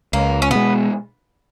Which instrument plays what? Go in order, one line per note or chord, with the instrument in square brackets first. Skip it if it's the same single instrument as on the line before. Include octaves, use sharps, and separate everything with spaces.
[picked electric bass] C#2 [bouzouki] A#3
[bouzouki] C#4
[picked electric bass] B2 G#3 [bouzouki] B3